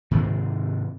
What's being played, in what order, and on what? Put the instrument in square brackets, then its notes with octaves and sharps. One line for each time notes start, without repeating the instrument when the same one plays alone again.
[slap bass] G#2 C3 D#3 G#3